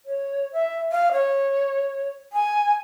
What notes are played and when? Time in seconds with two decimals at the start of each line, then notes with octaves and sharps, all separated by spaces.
0.06 C#5
0.53 E5
0.92 F5
1.12 C#5
2.33 G#5